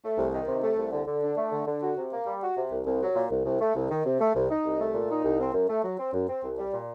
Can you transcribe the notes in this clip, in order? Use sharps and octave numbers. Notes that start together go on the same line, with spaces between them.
A3
C2
D#3
C3
A3
C2
D3
D3
D4
A3
D3
D3
F#4
C3
A#3
G3
F#4
C3
C2
C2
F#3
A#2
C2
C2
A3
C2
D#3
C3
A3
C2
D#4
C2
A3
A#2
D#4
C2
C4
F#2
A3
F#3
C4
F#2
C4
C2
G3
A#2